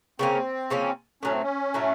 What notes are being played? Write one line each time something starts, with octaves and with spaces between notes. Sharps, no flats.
C#3 F3 A#3 C4 C#4
C#3 F3 A#3 C#4
A2 F#3 A3 C#4
C4
C#4
A2 F#3 A3